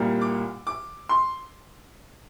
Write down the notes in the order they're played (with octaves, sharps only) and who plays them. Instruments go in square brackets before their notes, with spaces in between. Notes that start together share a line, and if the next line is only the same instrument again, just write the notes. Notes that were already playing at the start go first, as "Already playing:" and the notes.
Already playing: [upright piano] C2 A#2 G3 A#3
D6
D6
C6